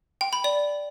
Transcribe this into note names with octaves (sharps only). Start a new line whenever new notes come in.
G5
B5
D5